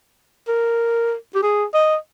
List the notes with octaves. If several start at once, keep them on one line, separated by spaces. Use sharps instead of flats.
A#4
G4
G#4
D#5